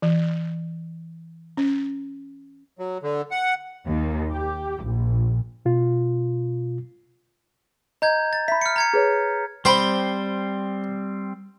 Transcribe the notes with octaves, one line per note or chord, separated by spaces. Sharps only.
E3
C#4
F#3
D3
F#5
D#2
G4
A#1
B2 F4
D#5 A#5 G6 G#6
A6
E5 B5 B6
F6 C#7
A#5 G#6 C#7
G#4 B4 C#5
G3 C4 C5 G5 B5